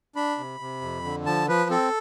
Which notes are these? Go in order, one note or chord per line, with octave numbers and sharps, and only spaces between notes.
D4 B5
C3
C3
F2
D3
F3 A5
F3 B4
C4 A4